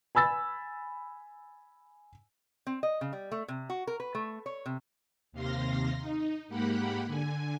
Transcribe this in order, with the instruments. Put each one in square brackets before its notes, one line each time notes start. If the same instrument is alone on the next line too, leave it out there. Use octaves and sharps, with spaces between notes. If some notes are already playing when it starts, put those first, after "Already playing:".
[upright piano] G#5 B5 E6 A6
[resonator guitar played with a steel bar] C4
D#5
C#3
G3
A3
C3
F#4
A#4
B4
A3
C#5
C3
[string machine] D#2 C3 F5 C6 A#6
D#4
G#2 A#3 G4 F#5 B5
D3 G#5